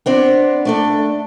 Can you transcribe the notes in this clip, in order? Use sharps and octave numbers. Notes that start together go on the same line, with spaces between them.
B3 C4 D4
A3 D4 A4